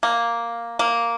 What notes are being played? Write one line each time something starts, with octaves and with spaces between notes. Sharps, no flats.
A#3
A#3